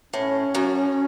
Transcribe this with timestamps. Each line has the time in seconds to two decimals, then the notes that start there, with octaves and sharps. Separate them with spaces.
0.13 A2 C#4
0.55 F#2